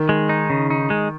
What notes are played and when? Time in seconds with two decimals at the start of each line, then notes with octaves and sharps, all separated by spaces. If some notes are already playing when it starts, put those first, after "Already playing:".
Already playing: D#3
0.09 G#3
0.29 D#4
0.50 C#3
0.70 D#4
0.90 G#3